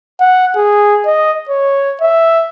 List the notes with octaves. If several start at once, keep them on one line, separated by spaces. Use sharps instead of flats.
F#5
G#4
D#5
C#5
E5